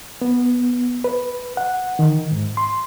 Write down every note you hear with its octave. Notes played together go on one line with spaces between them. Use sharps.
B3
B4
F#5
D#3
G#2
C6